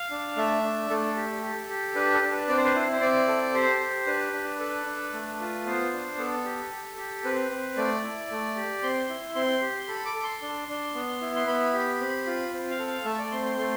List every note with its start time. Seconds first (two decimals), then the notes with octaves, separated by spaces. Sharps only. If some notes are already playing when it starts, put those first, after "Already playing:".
Already playing: F5
0.10 D4
0.37 A3 E5
0.64 D4
0.90 A3 A4
1.16 G4
1.43 G4
1.69 G4
1.95 D4 B4
2.14 A4
2.22 D4
2.32 B4
2.48 C4 D5
2.57 C5
2.65 B4
2.74 E4 C5
2.92 C5
3.01 C4 D5
3.28 A4
3.54 G4 C5
3.80 G4
4.06 D4 B4
4.33 D4
4.59 A4 B4
4.86 D4
5.13 A3
5.40 F4
5.65 B3 C5
5.93 D4
6.18 B3 A4
6.45 G4
6.71 G4
6.97 G4
7.25 C4 B4
7.51 C4
7.77 A3 D5
8.03 E4
8.30 A3
8.56 G4
8.83 C4 C6
9.09 E4
9.35 C4 C6
9.61 G4
9.88 A4 B5
10.06 D6
10.15 A4
10.23 C6
10.42 D4
10.68 D4
10.95 B3
11.21 E4
11.36 C6
11.47 B3 B5
11.73 G4
12.00 C4
12.26 F4
12.53 C4
12.70 F5
12.79 A4
12.87 F5
13.05 A3 E5
13.19 D5
13.31 C4 C6
13.45 C6
13.58 A3 C6